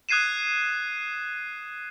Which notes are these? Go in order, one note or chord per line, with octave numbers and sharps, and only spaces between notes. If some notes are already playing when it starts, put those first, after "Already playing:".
D#6 F#6 G#6 C7 D#7 E7